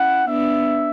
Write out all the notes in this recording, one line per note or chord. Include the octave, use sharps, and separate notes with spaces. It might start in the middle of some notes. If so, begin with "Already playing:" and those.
Already playing: C#4 E4 F#5
B3 D4 E5